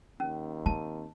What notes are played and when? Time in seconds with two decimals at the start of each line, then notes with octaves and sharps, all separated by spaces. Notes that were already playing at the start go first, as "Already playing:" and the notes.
0.20 D#2 C#4
0.66 C4 A5